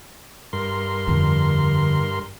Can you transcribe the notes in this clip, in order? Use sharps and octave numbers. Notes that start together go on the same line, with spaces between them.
G2 A#4 C6
F2 D3